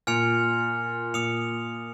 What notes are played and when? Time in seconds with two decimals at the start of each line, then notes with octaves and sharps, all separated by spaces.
0.07 A#2 G#5 F6 C#7 F7
1.14 A#2 D#6 C#7 F7